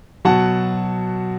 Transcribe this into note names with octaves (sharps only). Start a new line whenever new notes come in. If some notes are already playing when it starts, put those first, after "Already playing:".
B2 F#3 F#5 A5